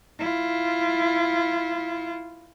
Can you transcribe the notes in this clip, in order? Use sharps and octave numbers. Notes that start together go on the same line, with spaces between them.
E4 F4